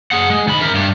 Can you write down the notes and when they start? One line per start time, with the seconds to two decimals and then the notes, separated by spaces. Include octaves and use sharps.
0.11 G#4 F#5
0.30 G#3
0.48 D#3 B5
0.61 A#4 E5
0.74 G2 G4